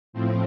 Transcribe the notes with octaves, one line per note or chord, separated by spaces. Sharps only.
A2 F3 C4